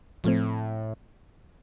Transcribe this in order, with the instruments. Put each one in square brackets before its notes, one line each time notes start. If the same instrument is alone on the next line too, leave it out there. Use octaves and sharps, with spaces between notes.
[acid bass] A2 [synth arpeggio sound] F3 A3 C4